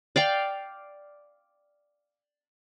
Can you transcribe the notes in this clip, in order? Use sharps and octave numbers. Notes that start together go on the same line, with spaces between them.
D5 F5 G5